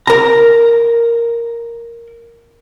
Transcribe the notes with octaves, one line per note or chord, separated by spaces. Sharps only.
A#4 A#5